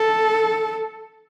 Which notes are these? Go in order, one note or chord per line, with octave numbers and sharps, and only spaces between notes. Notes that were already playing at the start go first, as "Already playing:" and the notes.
Already playing: A4